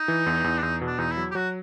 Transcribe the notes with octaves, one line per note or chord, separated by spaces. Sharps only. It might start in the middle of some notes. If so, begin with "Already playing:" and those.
Already playing: D#4
E3
E2
E2
D4
E2 D#4
B2
D4
E2 D#4
E4
F#3
G4
F#3 F#4